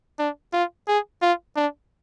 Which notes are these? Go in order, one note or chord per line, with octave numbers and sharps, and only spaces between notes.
D4
F4
G#4
F4
D4